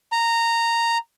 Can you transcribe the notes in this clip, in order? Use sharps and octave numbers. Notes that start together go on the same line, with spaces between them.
A#5